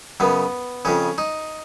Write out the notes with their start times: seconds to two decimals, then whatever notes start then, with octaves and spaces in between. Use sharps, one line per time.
0.20 F#2 C#3 B3
0.85 F2 C#3 C#4
1.18 D#4